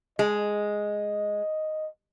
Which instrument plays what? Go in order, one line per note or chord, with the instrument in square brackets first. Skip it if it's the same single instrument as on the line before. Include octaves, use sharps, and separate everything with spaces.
[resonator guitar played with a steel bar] G#3 [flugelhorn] D#5